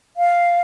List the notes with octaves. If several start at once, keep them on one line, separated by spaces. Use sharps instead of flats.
F5